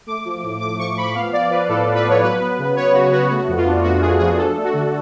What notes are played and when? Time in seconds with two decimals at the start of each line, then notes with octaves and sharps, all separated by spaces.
0.07 A3 D6
0.25 F3
0.43 A2
0.60 A3 D6
0.79 F3 C#6
0.96 F3 B5
1.15 B3 F5
1.33 F3 D5
1.50 F3 B4
1.68 A2 A4
1.86 A2
1.95 B4
2.04 B3
2.09 C#5
2.23 F#3 B4
2.41 B3
2.58 C#3
2.76 B3 C#5
2.94 C#3 F#4
3.12 B3 F#4
3.29 A3 F#4
3.48 F2
3.57 F4
3.66 D4
3.83 A3 F#4
4.01 F2 G#4
4.19 F3 G#4
4.38 D4 A4
4.56 A3
4.64 F#4
4.74 D3